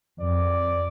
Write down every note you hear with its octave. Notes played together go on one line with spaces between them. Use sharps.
F2 D5